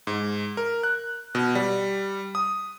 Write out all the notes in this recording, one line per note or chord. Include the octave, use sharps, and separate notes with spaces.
G#2
A#4
F#6
B2
G3
D#6